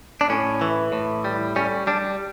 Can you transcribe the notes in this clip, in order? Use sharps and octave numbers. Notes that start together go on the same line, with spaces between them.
D4
A2 C#4
E3
A2
G3
G3 C#4
G3 D4